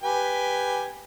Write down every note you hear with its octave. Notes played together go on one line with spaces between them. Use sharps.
G4 B4 G#5